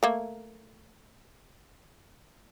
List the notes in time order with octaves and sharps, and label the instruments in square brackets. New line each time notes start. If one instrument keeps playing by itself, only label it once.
[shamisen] A3 A#3